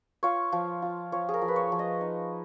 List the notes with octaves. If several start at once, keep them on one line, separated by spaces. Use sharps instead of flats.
F4 C#5
F3
F4
F3 C#5
G#4
A#4
F3
B4
C#5
F3
D#5
D#4